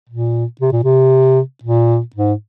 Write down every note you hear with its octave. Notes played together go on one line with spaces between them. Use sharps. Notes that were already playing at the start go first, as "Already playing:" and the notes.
A#2
C3
A#2
C3
A#2
G#2